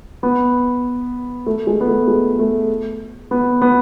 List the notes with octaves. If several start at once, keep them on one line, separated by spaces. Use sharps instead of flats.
B3
A3
G#3
B3
A3
G#3
A3
B3
B3